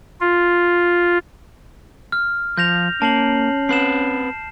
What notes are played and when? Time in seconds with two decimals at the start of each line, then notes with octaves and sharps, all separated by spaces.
0.21 F4
2.12 F6
2.57 F3 G6 A#6 F7
3.02 A#3 C#4 A5 C7 F#7
3.69 C4 B4 C7 E7